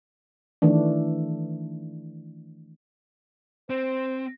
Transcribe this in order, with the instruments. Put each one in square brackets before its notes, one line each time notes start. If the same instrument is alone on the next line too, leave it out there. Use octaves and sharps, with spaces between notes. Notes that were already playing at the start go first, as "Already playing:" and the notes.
[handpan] D#3 E3 A3 D4
[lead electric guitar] C4 [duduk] C5